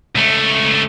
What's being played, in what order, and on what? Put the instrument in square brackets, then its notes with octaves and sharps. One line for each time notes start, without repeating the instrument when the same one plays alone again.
[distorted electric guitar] C#2 A3